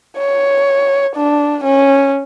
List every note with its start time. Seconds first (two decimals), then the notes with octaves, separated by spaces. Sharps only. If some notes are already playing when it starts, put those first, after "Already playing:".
0.18 C#5
1.16 D4
1.65 C#4